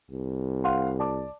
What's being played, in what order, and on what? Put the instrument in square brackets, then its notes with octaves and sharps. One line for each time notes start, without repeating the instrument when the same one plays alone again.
[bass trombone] C2
[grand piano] F5 F#5 C6
D5 A5 D6